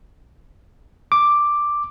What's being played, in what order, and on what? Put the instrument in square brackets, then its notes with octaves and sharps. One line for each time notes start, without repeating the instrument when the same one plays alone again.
[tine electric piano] D6